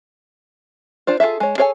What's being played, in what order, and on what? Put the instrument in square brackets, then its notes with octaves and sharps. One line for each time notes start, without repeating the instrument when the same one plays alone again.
[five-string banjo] D4 F4 C5
F4 G#4 A4 E5
G#3 C#5
G#4 A4 C#5 G5 G#5